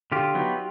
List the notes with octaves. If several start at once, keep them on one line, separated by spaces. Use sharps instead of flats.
D3 F4 G4
F#3 B3 D#4